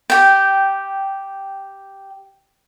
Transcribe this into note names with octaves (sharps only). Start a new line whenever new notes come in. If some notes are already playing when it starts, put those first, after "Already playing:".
G4 G5